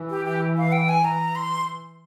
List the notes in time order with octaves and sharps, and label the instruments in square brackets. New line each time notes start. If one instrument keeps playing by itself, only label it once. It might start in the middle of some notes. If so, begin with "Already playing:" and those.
Already playing: [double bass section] E3
[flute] G4
G4
F5
G5
G#5
[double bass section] E3 [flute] A#5
[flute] C6